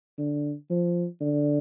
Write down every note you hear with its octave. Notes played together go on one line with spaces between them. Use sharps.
D3
F3
D3